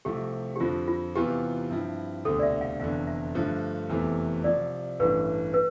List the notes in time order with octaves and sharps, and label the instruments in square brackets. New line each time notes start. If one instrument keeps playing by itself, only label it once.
[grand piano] C2 C3 F3 A3 C4 [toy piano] G4
[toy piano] G4
[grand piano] F2 D3 F3 [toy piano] F4
[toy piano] F4
[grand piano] E2 C3 E3 B3 F4 [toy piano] G4
[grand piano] G2 F3 C4 E4
[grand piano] E1 D2 C3 [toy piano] A4
[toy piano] D5
E5
F5
[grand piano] F1 E2 D3 [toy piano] F5
[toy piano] E5
[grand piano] G2 D3 F3 A3
F1 E2 C3 E3 A3
[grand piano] C2 C3 F3 [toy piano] D5
[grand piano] A1 G2 E3 A3 [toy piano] B4
[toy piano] B4